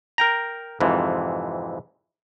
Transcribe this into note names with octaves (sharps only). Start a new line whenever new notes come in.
A#4 G5 A#5
F2 G#2 C3 E3